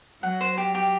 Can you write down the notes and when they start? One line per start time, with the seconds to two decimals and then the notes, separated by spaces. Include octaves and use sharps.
0.23 F#3 F#5
0.41 C5
0.57 G4
0.75 G4